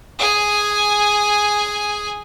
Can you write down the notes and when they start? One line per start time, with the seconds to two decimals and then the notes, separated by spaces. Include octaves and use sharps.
0.19 G#4 G#5